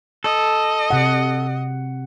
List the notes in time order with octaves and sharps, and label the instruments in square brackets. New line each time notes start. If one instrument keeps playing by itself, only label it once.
[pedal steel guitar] A4 [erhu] D#5
[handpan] C3 F#5